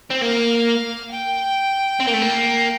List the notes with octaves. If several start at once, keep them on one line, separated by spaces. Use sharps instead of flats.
C4
A#3 F5
G5
C4
A#3
A3
A#3